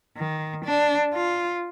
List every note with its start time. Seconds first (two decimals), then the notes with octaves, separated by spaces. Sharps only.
0.17 D#3
0.65 D4
1.13 F4